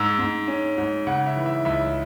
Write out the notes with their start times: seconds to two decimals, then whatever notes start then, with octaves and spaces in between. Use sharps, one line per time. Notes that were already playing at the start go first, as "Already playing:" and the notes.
Already playing: G#2 E6
0.19 G#2
0.48 C#4
0.78 G#2
1.07 C#3 F#5
1.26 E5
1.36 E3
1.46 E5
1.65 C#2 E5